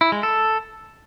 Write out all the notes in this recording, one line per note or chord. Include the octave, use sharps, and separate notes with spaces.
E4
G#3
A4